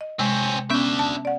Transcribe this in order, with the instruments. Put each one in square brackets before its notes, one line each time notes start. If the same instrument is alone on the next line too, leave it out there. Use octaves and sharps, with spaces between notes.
[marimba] D#5
[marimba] C3 G#3 [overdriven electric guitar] C4 C#4
[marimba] B3 C#4 G6 [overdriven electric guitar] D4 E5
[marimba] A5
D5 F#5